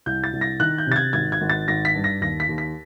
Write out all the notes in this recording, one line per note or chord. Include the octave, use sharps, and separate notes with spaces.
C2 G6
A6
C2
A#6
D#3 F#6
G6
C3 A6
G#6
G#1 G#6
G#6
G#1
A6
G#1 A#6
B6
G2
A#6
D#2 A#6
B6
D#2
B6